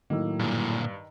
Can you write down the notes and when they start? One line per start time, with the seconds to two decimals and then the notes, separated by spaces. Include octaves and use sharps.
0.10 A2 D#3 F#3 A#3 E6
0.39 G2 A#2 D3